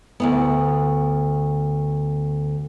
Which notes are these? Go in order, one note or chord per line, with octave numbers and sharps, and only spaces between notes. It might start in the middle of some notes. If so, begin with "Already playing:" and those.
D2 G2 B3